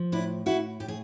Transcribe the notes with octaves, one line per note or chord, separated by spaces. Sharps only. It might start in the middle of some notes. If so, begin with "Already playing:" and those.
Already playing: F3
A2 D4 E4
A2 E4 F#4
A2 G4
G#4